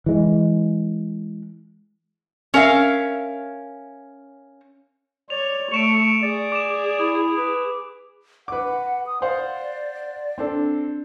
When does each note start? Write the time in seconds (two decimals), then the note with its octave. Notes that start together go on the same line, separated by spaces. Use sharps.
0.06 E3 G#3
2.54 C#4 A#4 E5 F5
5.30 C#5 D5 F7
5.72 A3 C#6 D7 E7 F7
6.22 G#4 D5
6.52 D6 E7
6.99 E4 D#6
7.37 B4
8.48 B4 F#5 D6
9.06 D#6
9.22 C5 D5 F5 F#5
10.38 C4 D4 A4